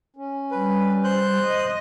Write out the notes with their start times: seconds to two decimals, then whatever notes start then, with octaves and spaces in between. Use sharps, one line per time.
0.16 C#4
0.51 G3 B4
1.04 C5 F#6 G6
1.42 D#5